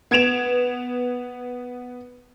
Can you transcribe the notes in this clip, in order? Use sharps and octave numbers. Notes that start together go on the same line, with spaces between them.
B3 G#6 D7 E7 F7